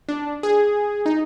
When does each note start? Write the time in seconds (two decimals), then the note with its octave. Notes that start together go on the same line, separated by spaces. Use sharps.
0.09 D4
0.43 G#4
1.06 D#4